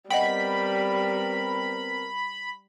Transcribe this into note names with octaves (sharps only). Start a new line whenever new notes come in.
G3 B3 C4 A#4 D#5 F#5 G5 B5